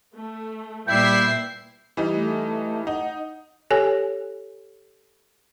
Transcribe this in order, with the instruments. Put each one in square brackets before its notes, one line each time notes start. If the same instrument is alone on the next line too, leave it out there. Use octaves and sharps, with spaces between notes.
[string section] A3
[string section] A#2 B3 C7 [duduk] G3 [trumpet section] E4 E5 [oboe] G5
[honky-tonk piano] E3 G3 D#4
[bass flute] A3
[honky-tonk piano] D#4 [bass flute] F#5
[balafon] G4 A4 C#5 G#5